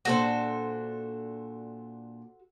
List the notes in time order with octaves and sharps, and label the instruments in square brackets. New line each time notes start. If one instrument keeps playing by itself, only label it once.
[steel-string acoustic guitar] A#2 D4 [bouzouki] F#4 A4 C5